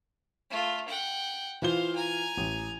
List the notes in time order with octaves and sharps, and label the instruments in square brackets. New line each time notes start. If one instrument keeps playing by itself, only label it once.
[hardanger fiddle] A3 F4
F#5 G5
[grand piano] E3 F4 G7 [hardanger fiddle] C5 F5
[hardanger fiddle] G#5 A#5
[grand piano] A1